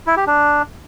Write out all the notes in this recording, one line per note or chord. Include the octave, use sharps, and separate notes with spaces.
E4
G4
D4